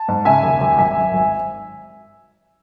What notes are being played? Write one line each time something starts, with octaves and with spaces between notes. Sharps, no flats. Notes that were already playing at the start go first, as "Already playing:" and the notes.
Already playing: A5
G#2
C#3 E5 G#5
D#2
D#2
G#1 E5 G#5
F#2
G#1